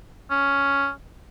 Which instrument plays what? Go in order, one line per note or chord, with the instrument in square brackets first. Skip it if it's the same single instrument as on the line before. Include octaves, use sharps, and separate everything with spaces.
[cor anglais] C#4